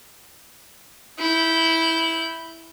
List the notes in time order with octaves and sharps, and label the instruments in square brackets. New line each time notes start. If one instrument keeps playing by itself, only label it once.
[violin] E4 G6